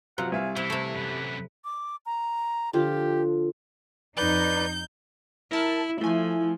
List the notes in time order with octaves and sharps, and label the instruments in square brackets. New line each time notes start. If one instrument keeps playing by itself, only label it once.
[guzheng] C3 [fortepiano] F3 F#3 F4 [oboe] F#5
[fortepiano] C2 E5 F5 [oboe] G#5
[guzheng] C3 [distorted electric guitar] E3 [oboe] E4
[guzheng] C3 A3
[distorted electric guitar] F#2 E3 [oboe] B4
[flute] D6
A#5
[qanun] D3 F3 F4 [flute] G4
[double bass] F2 [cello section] D#4 [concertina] B4 D5 [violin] G6
[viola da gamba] E4 [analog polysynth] A#4 A5
[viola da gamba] F3 [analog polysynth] A3 G#5 [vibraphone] E4